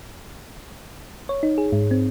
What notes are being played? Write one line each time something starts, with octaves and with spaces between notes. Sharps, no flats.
C#5
D#4
G#4
G#2
C4